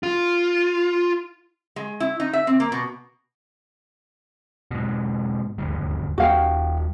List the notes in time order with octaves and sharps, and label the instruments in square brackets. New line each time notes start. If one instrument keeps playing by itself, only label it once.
[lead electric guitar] F4
[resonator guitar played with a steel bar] G#3
E4
D#4
E5
C4
A#3
B2
[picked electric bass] G#2 B2
D#1 D2 G2
[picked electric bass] D#2 G3 [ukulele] F#4 F5 G5